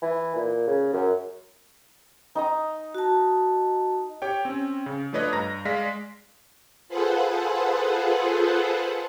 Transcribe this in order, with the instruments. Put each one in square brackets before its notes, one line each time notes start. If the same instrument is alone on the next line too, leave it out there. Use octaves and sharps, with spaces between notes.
[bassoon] E3
A#2
C#3
F#2
[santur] D#4 A#5 D#6
[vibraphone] F#4 A5
[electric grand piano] G4 C#5 G5
C4 C#4
C#3
F3 A3 D4 B4 C#5 D#5
G2 A#5 A#6
G#3 D5 F5 A#6 B6
[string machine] F4 G#4 A4 B4 C5 F#5